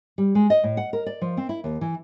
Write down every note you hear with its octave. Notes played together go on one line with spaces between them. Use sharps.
G3
G#3
D#5
A2
F#5
A#4
D5
F3
C4
E4
D#2
E3